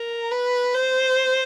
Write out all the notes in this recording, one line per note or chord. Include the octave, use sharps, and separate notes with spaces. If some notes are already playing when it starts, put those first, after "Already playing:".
Already playing: A#4
B4
C5